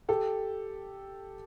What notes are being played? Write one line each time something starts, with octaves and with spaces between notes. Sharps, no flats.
G4 A4